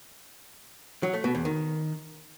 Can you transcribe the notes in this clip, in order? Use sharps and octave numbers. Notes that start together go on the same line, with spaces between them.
F#3
A3
B2
E2
D#3